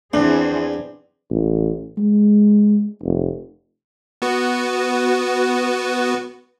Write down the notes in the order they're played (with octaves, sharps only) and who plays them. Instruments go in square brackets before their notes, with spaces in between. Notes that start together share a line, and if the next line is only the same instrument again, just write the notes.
[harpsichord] E2 [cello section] E3 C4 G#4 [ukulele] D4
[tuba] A1
G#3
F1
[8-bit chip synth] B3 F#4 B4